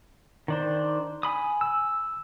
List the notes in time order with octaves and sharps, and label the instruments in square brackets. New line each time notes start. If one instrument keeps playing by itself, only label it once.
[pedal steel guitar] D#3 D4 C5
G#5 B5 D#6
[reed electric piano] E6